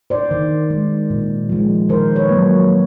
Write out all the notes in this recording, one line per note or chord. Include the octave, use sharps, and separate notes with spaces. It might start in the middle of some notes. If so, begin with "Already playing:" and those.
C5 D5
D#3
G#3
A#2
F3 G#3
D#3 A#4 C5
B4 C#5
F#3 A#3